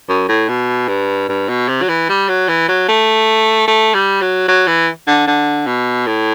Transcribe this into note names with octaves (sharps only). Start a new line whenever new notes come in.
F#2
A2
B2
G2
G2
B2
C3
F#3
E3
G3
F#3
E3
F#3
A3
A3
G3
F#3
F#3
E3
D3
D3
B2
A2